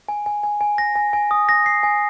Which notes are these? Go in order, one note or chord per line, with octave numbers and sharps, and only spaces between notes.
G#5
G#5
G#5
G#5
A#6
G#5
G#5
D#6
A#6
C7
G#5